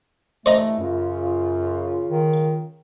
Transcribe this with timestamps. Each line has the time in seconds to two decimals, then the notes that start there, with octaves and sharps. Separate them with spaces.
0.46 G2 E3 A3 C5 D#5 A#5
0.79 F#2 C#3 F4
2.09 D#3